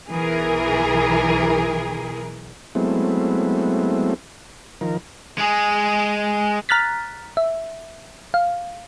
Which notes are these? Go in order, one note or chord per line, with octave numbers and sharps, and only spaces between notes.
B1 E3 G#4 A#4
F#3 G#3 A3 B3 C4 E4
D#3 F3 A#4
G#3 G#4
A#5 F6 F#6 A6 B6
E5
F5